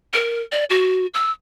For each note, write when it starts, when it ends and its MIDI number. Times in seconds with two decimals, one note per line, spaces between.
0.13 0.41 70
0.52 0.64 74
0.70 1.06 66
1.14 1.31 88